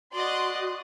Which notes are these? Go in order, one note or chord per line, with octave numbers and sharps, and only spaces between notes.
F#4 D5 D#5 C6 D#6